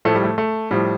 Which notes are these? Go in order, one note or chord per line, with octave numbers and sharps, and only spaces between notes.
A2 F3 A3
G3
A3
A3
A2 F3 G3